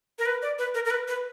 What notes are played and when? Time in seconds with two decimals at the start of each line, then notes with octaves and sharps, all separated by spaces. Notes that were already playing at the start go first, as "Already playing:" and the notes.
0.19 A#4
0.26 B4
0.42 D5
0.58 B4
0.74 A#4
0.85 A#4
0.91 B4
1.08 B4